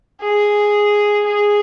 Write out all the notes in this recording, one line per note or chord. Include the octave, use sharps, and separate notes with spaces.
G#4
G#4